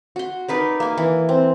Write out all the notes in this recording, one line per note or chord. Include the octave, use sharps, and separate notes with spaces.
F#4 C6
D#4 A#4 B4 D5
A#3 G#5
E3
C4